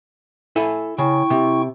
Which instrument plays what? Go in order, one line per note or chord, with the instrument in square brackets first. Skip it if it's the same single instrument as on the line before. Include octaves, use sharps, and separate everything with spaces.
[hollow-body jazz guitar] E4 A4 G#5
[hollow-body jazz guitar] C#3 [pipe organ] E4 G5 C#6
[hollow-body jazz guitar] C3